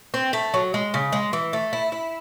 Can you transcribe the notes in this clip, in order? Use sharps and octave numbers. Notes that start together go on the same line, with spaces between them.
C4
A3
F#3
G#3
C#3
G#3
E3
A3
E4
E4